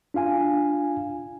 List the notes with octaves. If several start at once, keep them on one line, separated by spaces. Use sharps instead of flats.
D4 F4 F5 G#5